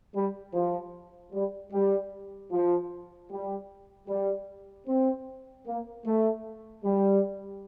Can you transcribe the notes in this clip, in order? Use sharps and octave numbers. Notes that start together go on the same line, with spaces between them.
G3
F3
G3
G3
F3
G3
G3
C4
A#3
A3
G3